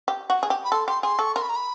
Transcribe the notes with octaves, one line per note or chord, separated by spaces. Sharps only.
G4
F#4
G#4
G4
B5
A4 C6
G4 C6
G#4 C6
A4 C#6
A#4 C6
B5
A#5
B5